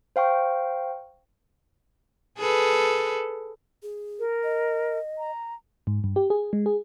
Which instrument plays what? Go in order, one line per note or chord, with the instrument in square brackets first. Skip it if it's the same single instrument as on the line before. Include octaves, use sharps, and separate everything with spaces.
[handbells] C5 F5 G5 C#6
[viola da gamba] G#4 A4 B4
[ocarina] G#4
[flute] A#4
[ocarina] D#5
[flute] A#5
[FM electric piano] G#2
G2
G4
G#4
G#3
G#4